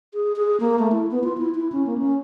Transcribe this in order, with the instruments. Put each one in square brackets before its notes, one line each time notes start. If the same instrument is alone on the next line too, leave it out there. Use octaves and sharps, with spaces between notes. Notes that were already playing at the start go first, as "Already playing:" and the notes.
[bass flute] G#4
G#4
A#3
A3
E4
B3
F4
E4
E4
C#4
A#3
C#4